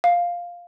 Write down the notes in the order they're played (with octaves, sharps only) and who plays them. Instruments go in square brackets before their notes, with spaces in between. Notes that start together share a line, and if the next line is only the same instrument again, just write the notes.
[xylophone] F5